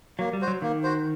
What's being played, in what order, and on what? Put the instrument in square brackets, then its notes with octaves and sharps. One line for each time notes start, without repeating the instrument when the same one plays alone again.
[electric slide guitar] F#3 [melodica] A#3
[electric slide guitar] G3
[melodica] F#4 C5
[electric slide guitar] F#3
[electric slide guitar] D#3 [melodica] A#3
[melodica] F#4 C5